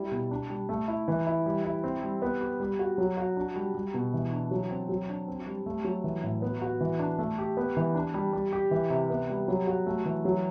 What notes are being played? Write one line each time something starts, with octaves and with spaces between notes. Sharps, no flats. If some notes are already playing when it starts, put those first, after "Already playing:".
Already playing: G3 E4
B2
D4
G3
A3
E4
E3
E4
G3
E4
C4
G3
B3
G4
G3
F#4
F#3
F#4
D4
G3
G3
B2
E3
D4
F#3
C4
F#3
D4
C4
G3
A3
F#3
E3
A2
B3
F#4
E3
D4
A3
G4
B3
E3
D4
G3
G3
G4
E3
C3
B3
G3
F#3
F#4
A3
E3
F#3